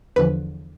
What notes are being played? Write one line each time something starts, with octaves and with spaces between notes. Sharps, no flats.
E2 D3 F3 B4